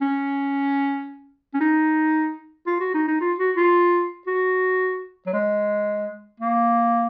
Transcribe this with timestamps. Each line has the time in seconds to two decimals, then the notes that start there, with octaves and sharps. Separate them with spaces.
0.01 C#4
1.54 C#4
1.60 D#4
2.67 F4
2.80 F#4
2.94 D#4
3.08 D#4
3.21 F4
3.39 F#4
3.57 F4
4.27 F#4
5.26 F#3
5.33 G#3
6.40 A#3